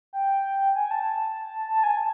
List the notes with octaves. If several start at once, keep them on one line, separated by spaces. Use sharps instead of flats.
G5
G#5
A5
A5
G#5